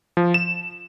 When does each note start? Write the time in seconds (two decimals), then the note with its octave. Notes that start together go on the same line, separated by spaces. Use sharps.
0.17 F3
0.34 E7